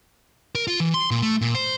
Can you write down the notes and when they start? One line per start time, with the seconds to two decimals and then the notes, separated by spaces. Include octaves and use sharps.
0.55 A#4
0.67 F4
0.80 E3
0.94 C6
1.11 A#2
1.22 A3
1.41 A#2
1.55 C5